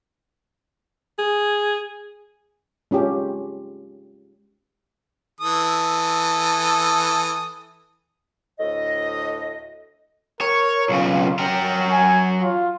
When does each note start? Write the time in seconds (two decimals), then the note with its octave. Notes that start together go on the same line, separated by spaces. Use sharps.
1.18 G#4
2.91 G#3 C#4 F4 G4
5.41 E3 A4 D#6
8.60 D2 A2 D#5
10.41 A#4 C#5
10.89 B1 C#3 F4
11.39 F#3 A#4 G5
11.90 G#5
12.42 F4